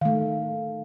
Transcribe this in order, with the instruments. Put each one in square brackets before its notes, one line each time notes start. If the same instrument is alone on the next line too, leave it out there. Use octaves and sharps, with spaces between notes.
[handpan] D#3 A3 [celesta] F5